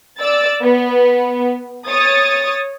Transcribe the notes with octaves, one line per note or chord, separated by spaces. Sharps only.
D5 E6 A6
B3
C#5 D#6 A6